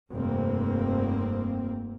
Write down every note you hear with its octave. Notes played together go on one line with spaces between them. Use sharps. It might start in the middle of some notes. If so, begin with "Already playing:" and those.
F1 G2 A#3 C4